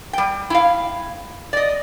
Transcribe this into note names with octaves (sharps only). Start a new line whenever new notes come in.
G3 G5
E4 F5
D5 D#5